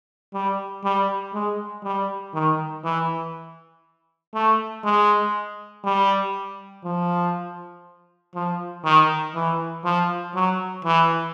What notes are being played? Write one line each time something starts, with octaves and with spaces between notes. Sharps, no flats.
G3
G3
G#3
G3
D#3
E3
A3
G#3
G3
F3
F3
D#3
E3
F3
F#3
E3